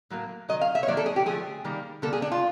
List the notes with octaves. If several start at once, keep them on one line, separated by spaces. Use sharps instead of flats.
A2 F#3 A#3
D#3 F#3 D#5
F5
E5
C#5
D#3 F#3 A#3 D5
A4
G#4
G4
D3 F3 A3 G#4
D#3 G3 A#3
D3 G3 A#3 A4
G#4
D4
F4